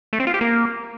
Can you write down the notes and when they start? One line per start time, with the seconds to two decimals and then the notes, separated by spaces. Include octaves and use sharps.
0.13 A3
0.20 C4
0.27 F4
0.34 G4
0.41 A#3